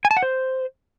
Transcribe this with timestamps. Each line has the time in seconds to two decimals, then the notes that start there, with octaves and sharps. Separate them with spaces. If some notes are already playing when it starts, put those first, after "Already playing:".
0.05 G#5
0.11 A5
0.17 F#5
0.23 C5